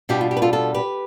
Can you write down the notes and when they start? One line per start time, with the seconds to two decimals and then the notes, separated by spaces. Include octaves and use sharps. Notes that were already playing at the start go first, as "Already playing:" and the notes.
0.09 B2 G3 D4 F4 G4
0.21 F4
0.31 G4
0.37 B4
0.42 F4 A4
0.53 F4 A4
0.74 G4 B4